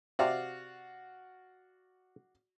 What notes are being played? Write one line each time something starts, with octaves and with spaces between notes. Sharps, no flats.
C3 F#4 D5 F5